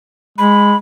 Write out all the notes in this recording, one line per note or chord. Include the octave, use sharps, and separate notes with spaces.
G#3 B5